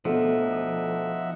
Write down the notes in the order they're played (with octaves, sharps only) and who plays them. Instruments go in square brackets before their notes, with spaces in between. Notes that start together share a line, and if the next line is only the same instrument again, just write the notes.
[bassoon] D2 [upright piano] B2 A3 [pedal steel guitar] F3 [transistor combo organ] D#4 E5 F#5